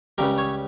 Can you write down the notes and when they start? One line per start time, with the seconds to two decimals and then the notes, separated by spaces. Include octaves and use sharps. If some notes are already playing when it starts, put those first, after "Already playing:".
0.18 C#2 C#3 G3 A#4
0.38 C#5